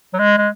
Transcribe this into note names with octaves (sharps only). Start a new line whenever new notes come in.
F#3
G#3
G#3